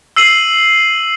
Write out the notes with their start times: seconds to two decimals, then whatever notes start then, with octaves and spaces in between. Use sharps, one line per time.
0.16 E6 C7 D#7 F#7